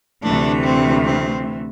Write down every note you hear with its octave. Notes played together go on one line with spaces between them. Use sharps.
D2 C3 E3 A3 D4
C4
C4